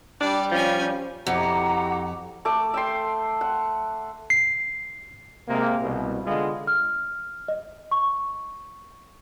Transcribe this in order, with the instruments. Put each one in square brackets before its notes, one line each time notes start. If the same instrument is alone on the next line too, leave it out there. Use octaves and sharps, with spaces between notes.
[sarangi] G3 [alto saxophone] D4 [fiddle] D5
[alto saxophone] F3 [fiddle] C#4 G#5
[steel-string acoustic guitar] F2 [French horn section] E4 F#4 G4 [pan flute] F#5 [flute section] A#5 D6
[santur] A3 D6
E5 G5 C6
F#5
[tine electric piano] C7
[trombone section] C3 G#3 A#3
C2 B2
D3 G#3 B3 F4
[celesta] F6
D#5
C#6